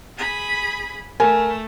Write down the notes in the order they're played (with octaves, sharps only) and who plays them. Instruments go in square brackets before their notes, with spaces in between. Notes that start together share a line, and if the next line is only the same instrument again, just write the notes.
[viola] G#4 B5
[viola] A3 [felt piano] A#4 G#5